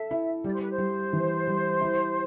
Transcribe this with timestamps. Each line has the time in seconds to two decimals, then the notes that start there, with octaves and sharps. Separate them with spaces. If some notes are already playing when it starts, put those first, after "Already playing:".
Already playing: A4 E5
0.11 E4
0.44 G3 D5
0.53 C5
0.61 B4
0.70 C5
0.78 G3
1.13 E3
1.47 G3
1.81 E4